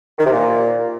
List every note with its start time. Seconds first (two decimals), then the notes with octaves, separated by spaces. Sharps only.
0.18 D#3
0.25 C3
0.32 A#2